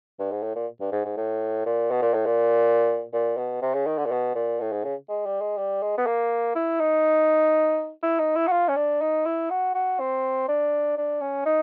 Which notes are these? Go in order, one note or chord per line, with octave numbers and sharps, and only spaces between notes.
G2
G#2
A2
A#2
G2
G#2
G#2
A2
A#2
B2
A#2
A2
A#2
A#2
B2
C3
C#3
D#3
D3
A#2
B2
A#2
A2
G#2
C#3
G#3
G3
G#3
G3
G#3
B3
A#3
E4
D#4
E4
D#4
E4
F#4
F4
C#4
D4
D#4
E4
F#4
F#4
C4
D4
D4
C#4
D#4